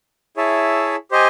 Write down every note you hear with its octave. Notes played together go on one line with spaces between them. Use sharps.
E4 G#4 C#5 E5 A5
G4 C5 D#5 G#5